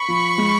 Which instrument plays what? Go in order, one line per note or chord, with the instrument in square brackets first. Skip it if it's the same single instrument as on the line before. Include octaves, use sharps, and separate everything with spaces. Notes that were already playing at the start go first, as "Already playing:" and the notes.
Already playing: [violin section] B5 C#6
[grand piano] F3
G#3